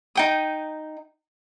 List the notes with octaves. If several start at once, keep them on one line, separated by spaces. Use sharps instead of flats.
D#4 G5 D#6